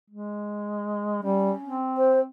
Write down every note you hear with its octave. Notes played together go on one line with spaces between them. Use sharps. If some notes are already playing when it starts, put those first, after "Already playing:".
G#3
G3 C#4
C4
C5